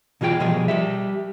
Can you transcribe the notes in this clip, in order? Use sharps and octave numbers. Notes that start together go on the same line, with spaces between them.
B2 E3 F4 G#4 G5
B2 F3 G3 G#4
G3 G4 E5